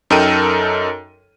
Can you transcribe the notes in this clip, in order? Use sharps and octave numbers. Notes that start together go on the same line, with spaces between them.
F#2 D#4 A4 A#4 G5 D#7